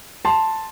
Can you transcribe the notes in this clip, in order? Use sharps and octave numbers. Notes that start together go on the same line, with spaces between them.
A5 C6